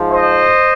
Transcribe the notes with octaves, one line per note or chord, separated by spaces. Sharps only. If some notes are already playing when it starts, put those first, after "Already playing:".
Already playing: G#2 F3
C5 D#5